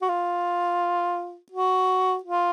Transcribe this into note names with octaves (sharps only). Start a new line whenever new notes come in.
F#4
F4
F#4
F4